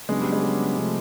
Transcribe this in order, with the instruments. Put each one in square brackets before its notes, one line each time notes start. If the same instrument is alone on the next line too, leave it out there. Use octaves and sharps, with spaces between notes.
[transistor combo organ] C#3 F#3 B3 D4 [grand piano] G#3
[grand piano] G3
G#3
G3
[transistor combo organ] C3 F3 A3